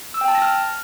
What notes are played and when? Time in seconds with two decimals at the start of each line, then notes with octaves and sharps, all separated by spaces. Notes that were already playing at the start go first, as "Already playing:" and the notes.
0.14 E6
0.21 G5
0.28 A5
0.35 A#6
0.42 F6